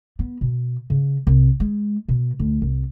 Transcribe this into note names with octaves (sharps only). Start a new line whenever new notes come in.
B3
B2
C#3
C2
G#3
B2
D2
C2